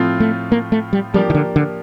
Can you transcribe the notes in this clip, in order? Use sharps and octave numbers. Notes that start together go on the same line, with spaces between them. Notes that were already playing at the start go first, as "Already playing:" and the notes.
Already playing: A2 F3 C4 F4
A3
A#3
A3
G3
F3 G3 A#3 D4 G4 A#4
D#3
D3
D3